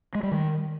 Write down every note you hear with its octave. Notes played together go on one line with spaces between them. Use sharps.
G#3
G3
D#3